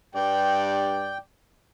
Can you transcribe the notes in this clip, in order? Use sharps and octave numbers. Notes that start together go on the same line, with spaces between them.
G2 D5 G5